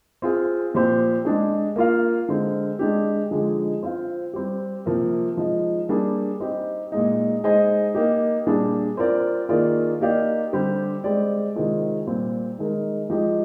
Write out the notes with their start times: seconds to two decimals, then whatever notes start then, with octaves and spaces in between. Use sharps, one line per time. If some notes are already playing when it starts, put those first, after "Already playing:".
0.22 C4 F4 G#4
0.74 A#2 F3 C4 G4 C5
1.25 G#3 D4 G#4
1.76 A#3 F4 A#4 F5
2.29 D3 G#3 C4
2.79 G#3 D4 G4
3.31 D3 F3 G#3 D#4 G#4
3.83 C4 F4 C5 F5
4.34 G3 C4 G4
4.86 C3 F3 A#3
5.37 F3 G#3 D#4
5.89 G3 A#3 D4 G#4
6.40 C4 D#4 G4
6.92 A#2 G#3 D#4
7.44 G#3 D#4 G#4 C5 D#5
7.95 A#3 D#4 G4
8.46 A#2 G3 D4 G#4
8.97 C4 F4 A#4 D5
9.49 D#3 A#3 F4 G#4 D5
10.00 A#3 D#4 G4 D5 F5
10.53 D3 G3 C4 G4 C5
11.04 G#3 C4 G4 D5
11.56 C3 D#3 G#3 C4 F4
12.07 A#2 G3 C4
12.59 D#3 G#3 D#4 A#4
13.10 F3 G#3 D#4 G4